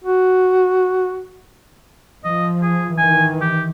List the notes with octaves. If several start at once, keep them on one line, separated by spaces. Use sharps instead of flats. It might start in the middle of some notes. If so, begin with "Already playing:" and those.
F#4
F3 D#5
G#4
D#3 E3 G#5
G4